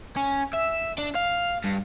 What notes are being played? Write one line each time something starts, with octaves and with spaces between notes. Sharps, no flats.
C#4
E5
D4
F5
G2